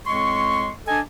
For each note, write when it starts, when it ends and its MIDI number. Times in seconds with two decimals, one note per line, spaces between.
0.06 0.69 41
0.06 0.69 45
0.06 0.69 56
0.06 0.69 84
0.06 0.69 85
0.87 1.00 62
0.87 1.00 69
0.87 1.00 75
0.87 1.00 80